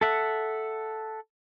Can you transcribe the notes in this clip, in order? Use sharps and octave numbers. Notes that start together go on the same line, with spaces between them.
A4 E5 F#5